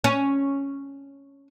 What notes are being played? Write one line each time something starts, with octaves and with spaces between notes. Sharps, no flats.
C#4